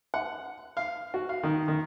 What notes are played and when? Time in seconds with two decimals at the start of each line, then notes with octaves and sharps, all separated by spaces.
0.14 F#5
0.77 F5
1.14 F#4
1.29 F5
1.43 D#3
1.68 D#3